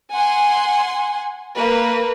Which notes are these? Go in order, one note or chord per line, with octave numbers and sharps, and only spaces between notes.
F#5 G#5 C6
A#3 B4